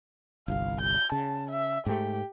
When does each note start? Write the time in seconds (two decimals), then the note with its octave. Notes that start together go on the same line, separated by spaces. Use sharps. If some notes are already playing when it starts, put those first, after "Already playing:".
0.48 G1 C2 F5
0.81 G6
1.12 C#3 A5
1.50 E5
1.86 G#2 A3 G4